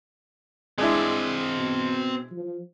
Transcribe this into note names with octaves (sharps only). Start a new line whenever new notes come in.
G#3 C4 D4 E4 D#5
B2
F3